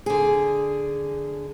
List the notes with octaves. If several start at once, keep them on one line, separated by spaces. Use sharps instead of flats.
D3 G#4